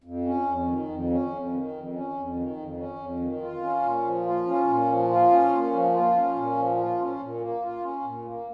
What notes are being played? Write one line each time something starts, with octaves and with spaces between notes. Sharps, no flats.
F2
C#4
F2
D#3
F2
C#4
F2
D#3
F2
C#4
F2
D#3
F2
C#4
F2
D#3
F4
C#4
A#2
F3
F4
C#4
A#2
F3
F4
C#4
A#2
F3
F4
C#4
A#2
F3
F4
C#4
A#2
A#3
F4
C#4
A#2
A#3